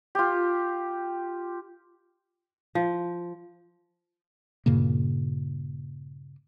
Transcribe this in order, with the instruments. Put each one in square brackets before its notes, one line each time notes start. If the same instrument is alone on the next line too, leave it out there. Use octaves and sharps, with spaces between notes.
[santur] F4 G4
[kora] F3
[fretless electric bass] G2 A#2 C#3 A#3